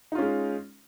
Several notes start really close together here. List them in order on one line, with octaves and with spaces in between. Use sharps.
D#4 F4 C#4 G#3